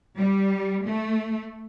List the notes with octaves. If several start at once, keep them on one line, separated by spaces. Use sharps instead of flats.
G3
A3